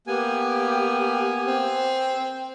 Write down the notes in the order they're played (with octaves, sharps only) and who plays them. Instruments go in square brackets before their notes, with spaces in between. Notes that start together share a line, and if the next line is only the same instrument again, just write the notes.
[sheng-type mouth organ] A#3 B3 G#5 [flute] G4
[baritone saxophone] C4